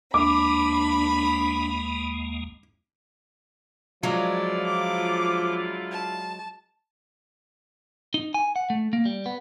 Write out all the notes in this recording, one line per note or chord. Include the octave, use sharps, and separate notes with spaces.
D#2 G#3 A#3 D4 B5 D6
D3 F3 F#3 G#3 E4 F4 D5
D6
A5
D#4
G#5
F#5
A3
A#3
G3
B3